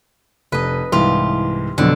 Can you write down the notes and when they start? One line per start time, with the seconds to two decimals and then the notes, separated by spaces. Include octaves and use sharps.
0.52 F1 B4 D#5
0.92 C2 G#2 E3 F4 G4
1.78 F2 B2 D3 F#3